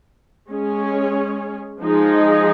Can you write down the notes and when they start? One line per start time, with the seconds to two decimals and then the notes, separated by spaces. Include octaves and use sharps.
0.49 G#3 C#4 G#4 C#5
1.80 F3 G#3 D#4 G#4